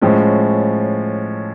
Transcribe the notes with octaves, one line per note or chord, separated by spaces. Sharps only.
A2 F3 G#3 C#4